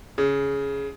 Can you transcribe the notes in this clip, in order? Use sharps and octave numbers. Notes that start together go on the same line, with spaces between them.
C#3